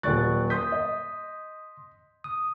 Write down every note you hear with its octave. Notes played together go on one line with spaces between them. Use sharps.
D#1 F#3 D5 C#6 F#6 A6
C6 D#6 G6 B6
D#5
D#6